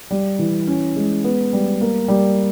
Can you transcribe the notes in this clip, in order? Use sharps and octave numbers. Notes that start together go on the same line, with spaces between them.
G3
E3
C#4
G#3
B3
G3
A#3
G3